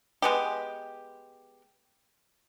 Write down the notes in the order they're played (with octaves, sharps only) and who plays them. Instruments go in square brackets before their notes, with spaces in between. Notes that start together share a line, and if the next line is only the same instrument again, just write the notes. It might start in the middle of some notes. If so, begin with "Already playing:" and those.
[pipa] G#3 B3 G4